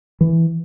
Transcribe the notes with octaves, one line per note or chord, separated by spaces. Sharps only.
E3